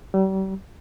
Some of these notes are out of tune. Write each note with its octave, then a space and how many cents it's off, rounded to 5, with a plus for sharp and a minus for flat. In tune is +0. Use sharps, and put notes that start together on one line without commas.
G3 -40